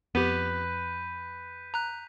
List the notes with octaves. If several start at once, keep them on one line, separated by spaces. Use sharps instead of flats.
F2 B3 G4 B4 G6 B6 D#7
A#5 F#6